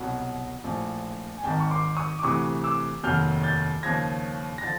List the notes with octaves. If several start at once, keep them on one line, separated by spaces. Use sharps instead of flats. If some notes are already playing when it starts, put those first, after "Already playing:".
Already playing: C2 B2 F#3
A#1 A2 F3
G#5
G#1 G#2 D#3 G5 A5
C#6
C6 D6
C#6 D#6
D6
D2 C3 E3 C#6 D#6
D6 E6
F1 D#2 D#3 F#3 F6 G6
G6 A6
D#2 C#3 F3 G#6 A#6
A#6
D3 F3 A6